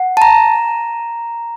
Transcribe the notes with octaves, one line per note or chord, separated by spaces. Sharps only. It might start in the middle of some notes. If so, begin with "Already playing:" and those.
Already playing: F#5
A5
A#5